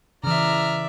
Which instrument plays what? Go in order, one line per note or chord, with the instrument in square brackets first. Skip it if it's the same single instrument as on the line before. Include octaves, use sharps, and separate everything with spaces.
[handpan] C#3 E3 [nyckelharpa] D5 E5 [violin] A#5 F6